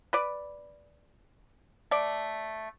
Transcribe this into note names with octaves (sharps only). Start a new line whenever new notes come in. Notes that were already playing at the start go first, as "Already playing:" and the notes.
B4 D5
A3 D5